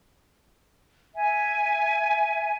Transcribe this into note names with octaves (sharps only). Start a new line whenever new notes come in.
E5 G#5